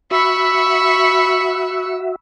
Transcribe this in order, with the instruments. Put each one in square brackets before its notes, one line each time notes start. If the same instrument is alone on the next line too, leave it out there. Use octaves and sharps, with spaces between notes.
[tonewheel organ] F#4 E5 [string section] B5 C#6 [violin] E6 C#7